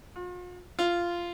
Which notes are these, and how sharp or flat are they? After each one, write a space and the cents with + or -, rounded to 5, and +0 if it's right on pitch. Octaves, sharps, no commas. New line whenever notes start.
F4 +45
F4 -10